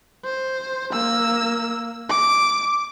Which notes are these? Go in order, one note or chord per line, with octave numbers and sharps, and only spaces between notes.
C5
A#3 E6
D6